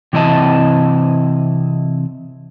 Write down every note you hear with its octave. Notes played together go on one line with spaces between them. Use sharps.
C3 E3 C4 E4 D#5 A5